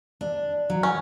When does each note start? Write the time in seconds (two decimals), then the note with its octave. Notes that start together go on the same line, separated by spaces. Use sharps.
0.21 D4
0.70 F#3
0.83 C#4